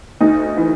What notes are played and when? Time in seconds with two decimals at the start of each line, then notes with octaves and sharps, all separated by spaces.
0.20 D2 D#4
0.57 E3